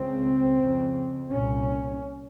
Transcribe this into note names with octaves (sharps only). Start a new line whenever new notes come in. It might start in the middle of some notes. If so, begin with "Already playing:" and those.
Already playing: C#2 C#3 C4
F2 C#3
C2 A#2 C#4